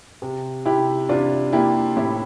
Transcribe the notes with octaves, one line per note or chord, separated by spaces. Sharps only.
C3
C3 E4 G4
C3 D4 F4
A#3 E4 G4
A2 E4 G4